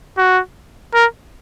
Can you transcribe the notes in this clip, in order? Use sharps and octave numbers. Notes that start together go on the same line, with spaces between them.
F#4
A#4